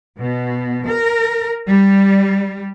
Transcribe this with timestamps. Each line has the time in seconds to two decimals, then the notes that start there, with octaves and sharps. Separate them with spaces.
0.17 B2
0.88 A#4
1.69 G3